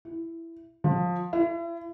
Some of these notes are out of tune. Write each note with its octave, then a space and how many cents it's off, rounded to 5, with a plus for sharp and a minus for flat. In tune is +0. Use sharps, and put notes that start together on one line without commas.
E4 +10
F3 +20
E4 +40